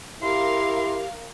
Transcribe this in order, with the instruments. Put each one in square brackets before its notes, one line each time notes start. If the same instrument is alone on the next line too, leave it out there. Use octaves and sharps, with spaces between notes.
[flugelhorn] E4 [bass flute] G4 [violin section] A#4 F5 [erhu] C6